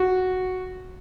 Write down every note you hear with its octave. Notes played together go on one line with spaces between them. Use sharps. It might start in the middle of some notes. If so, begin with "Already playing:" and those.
Already playing: F#4